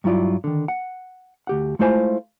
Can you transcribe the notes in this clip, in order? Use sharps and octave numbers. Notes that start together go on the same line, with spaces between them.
G2 F#3 E4 F4 D5
D3 D#3
F#5
D2 G4 F#5
G#3 A3 E4 F4 C5 G#5